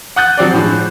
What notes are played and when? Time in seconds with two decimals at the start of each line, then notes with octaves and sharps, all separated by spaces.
0.16 F#5 D#6 F#6 G6 A6
0.38 F3 F#3 C4 D5
0.53 A2 D3 F3 G#3